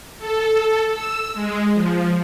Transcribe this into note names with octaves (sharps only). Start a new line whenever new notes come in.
A4
E6
G#3
F3